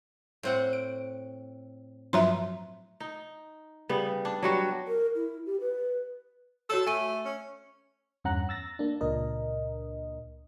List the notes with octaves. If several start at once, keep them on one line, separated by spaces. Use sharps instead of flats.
A2 C4 F#5
D7
G2 F3 F#3 E5 A#5 C6
D#4
C#3 G3 B3
D4
F#3 G3 F#4
A#4
E4
G4
B4
F#4 A4 C#5 E6
A3 G#5 D#7
C#4
E2 G2 C#4 F#5 A#5 F#6
E6 A6 A#6
A#3 D4
C#2 A#2 D4 A#4 D#5